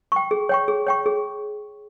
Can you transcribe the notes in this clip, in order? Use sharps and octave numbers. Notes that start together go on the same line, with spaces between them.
G5 C#6
G#4
C#5 G5 C#6
G#4
C#5 G5 C#6
G#4